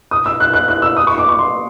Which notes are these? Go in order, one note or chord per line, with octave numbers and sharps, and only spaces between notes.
D#6
E6
F#6
F#6
F#6
E6
D#6
C#6
D6
C#6
C6